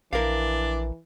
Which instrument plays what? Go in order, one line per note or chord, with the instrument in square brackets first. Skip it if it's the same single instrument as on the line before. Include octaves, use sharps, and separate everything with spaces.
[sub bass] A#1 [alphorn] E3 [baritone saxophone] D4 [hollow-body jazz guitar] A#4 F5